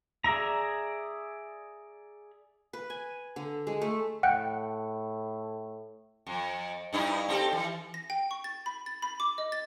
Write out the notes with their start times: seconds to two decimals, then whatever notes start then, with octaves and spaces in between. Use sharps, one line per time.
0.24 G#4 D5 E5 A#5
2.73 B4
2.90 G#5
3.36 D3
3.67 G#3
3.82 A3
4.23 A2 F#5 G5 F#6
6.27 F2
6.93 G2 D#4 E4
7.28 C4 G4 A4
7.53 E3
7.94 A#6
8.10 G5
8.31 C#6
8.44 A6
8.66 B5
8.86 A6
9.02 B5
9.20 D6
9.38 D#5
9.52 A6